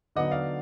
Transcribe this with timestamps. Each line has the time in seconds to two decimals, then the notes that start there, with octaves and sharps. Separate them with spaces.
0.16 D3 F#3 B3 D#4 D#5 F#5
0.31 D5 F5